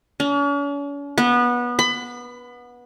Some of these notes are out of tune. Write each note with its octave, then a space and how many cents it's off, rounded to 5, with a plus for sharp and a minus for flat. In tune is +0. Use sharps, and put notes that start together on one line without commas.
C#4 +45
B3 -20
B5 +25